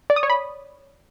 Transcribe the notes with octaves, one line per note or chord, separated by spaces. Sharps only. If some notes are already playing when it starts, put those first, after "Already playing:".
D5
D#6
C#5
B5